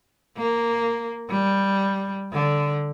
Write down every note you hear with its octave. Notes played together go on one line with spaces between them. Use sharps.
A#3
G3
D3